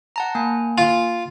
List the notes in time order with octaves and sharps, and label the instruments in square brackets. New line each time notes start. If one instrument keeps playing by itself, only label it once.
[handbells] F#5 A5 A#5
A#3 G#5
[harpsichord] F4